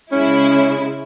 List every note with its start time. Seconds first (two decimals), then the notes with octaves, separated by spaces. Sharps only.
0.12 C#3 G#3 C#4 E4